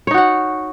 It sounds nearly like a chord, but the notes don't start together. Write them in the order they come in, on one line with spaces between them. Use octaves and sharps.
C#5 D#4 F#4 F#5